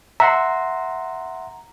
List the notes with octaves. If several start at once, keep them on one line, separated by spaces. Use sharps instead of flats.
E5 F#5 A#5 C6